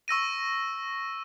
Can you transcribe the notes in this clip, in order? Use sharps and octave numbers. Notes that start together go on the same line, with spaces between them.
C#6 E6 A#6 D#7